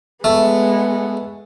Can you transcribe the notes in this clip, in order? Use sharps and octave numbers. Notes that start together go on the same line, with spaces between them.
G#3 A3 B3